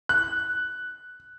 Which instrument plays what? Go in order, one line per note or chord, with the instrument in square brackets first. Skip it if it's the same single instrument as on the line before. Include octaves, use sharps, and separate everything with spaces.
[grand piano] F#6